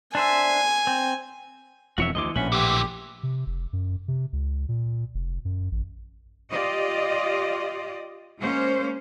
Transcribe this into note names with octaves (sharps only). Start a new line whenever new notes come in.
D4 C5 E5 G#5
C4
E1 F2 E3 F#4 C#5 E5
D2 D#3 E3 D#5 C6 D6
A#1 A2 C#4 B4 E5 F#5
A#2 E3 G4
C3
F1
F#2
C3
C#2
A#2
F1
F#2
A1
F4 G4 D5 D#5
G#3 A#3 C#4 C5